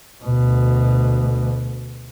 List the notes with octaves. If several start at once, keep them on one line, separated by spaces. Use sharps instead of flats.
D2 B2